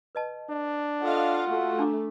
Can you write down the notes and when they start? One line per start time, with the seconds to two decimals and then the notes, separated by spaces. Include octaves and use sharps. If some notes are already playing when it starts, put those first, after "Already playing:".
0.15 B4 D#5 A5
0.50 D4
1.02 F4 A4 C#5 D#5 F5 F#5
1.49 A3 F#4
1.79 D4 A#5 D6